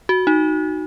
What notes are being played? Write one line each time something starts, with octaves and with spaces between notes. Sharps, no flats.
F#4
D#4